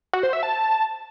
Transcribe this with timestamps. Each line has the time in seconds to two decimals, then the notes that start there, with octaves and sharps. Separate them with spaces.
0.13 F#4
0.23 C5
0.33 E5
0.43 A5